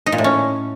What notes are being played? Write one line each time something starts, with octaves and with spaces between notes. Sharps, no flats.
D#4
A#2
A2
C#4